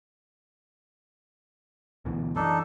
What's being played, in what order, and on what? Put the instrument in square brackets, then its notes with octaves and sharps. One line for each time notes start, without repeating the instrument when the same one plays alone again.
[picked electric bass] D2 B2 E3
[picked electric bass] F#2 E3 [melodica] D4 D#4 A4